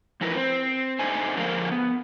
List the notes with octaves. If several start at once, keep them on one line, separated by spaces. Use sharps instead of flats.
E2 F3 E4 A#4 B4
C4
A3 D4 D#4 C5 G#5
D3 F3 G#3 A#3 A#4 F5
B3